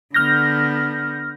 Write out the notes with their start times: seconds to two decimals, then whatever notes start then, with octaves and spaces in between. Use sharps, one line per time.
0.14 D3 B3 F6 G6 A#6